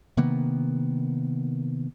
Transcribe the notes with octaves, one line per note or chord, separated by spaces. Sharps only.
C3 D#3 A#3 B3